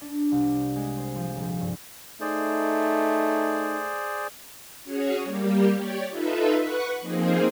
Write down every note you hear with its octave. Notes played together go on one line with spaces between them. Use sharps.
D4
C2
G#3
C5
F3
D#1
G2
A3 D#4 G#4 C5 D5
C#4 F#4 G#4 C#5
G3 A#3 G4
G4 C#5 D5
D#4 F4 A4 B4 E5
B4 F#5 C#6 F#6
F3 A#3 C4 D#4 G#4